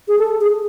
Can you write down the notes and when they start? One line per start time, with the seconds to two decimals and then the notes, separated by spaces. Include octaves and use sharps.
0.08 G#4
0.19 A4
0.41 G#4